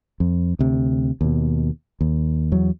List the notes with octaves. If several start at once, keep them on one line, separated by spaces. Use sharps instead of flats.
F2
D2 C3
D#2 B2
D#2
E2 F#3